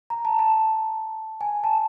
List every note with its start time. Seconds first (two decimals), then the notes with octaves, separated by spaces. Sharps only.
0.10 A#5
0.25 A5
0.39 A5
1.41 G#5
1.64 A5